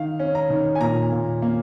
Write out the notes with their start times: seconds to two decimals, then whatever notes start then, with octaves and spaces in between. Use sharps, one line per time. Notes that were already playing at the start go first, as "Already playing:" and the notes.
Already playing: D#3 F5
0.20 C#4
0.35 A#5
0.50 D#3
0.75 G#5
0.80 A#2 A#5
1.12 A#2
1.42 A#3